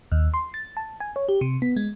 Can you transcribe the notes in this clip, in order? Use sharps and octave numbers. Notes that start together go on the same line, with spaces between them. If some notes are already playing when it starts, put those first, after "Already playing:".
D#2
C6
A6
A5
G#5
C#5
G4
C3
B3
G#3